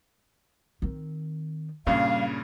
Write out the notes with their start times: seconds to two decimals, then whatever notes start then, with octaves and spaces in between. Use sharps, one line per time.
0.82 D#3 C4
1.87 G2 A#2 C#3 G3 F5